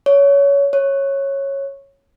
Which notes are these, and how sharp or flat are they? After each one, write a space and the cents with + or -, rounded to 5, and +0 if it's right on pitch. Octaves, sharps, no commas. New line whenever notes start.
C#5 +20
C#5 -10